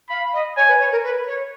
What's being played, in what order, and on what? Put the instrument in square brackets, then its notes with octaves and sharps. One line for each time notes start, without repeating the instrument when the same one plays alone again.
[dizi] F5 [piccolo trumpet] B5
[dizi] D#5
[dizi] C#5 [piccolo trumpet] G#5
[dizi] B4
C#5
A#4
B4
C#5